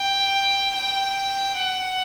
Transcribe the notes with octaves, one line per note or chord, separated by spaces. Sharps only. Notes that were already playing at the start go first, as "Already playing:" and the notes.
Already playing: G5
G5
F#5